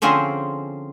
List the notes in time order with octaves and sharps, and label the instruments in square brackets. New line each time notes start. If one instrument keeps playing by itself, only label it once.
[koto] D3 F3 C4 C#4 G#4